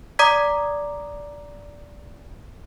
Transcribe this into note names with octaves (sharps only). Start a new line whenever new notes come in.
D5 A#5 D6 D#6 G#6 B6